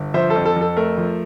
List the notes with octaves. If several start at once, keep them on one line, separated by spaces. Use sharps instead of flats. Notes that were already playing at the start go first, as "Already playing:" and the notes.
Already playing: G1
F3 C5 E5
A4 C5
F2
A4
F2 A4
A3 A#4
F3